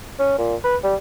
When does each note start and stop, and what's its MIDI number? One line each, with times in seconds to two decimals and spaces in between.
0.19 0.34 61
0.38 0.55 46
0.64 0.76 71
0.84 0.95 55